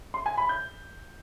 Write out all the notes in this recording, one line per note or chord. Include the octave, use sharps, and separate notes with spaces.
C6
G#5
B5
G6